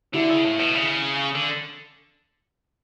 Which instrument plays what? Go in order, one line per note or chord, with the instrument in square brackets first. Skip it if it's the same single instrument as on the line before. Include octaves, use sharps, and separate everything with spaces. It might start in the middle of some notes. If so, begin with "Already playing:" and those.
[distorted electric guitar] D3 [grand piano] E4
[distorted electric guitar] C#3
A2
B2
C#3
D3